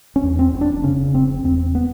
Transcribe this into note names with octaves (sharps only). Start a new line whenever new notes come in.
C#4
E2
C4
F1
D4
C#3 C#4
F1 C4
E2 C4
B3